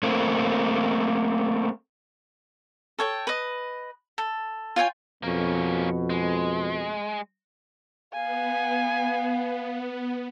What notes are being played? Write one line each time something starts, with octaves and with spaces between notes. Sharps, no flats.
A3 A#3 C4
A4 C#5 G5
B4 D#5
A4
F4 C#5 G5 G#5
F2 B2 A#3 C#4
G#3
B3 F5 G#5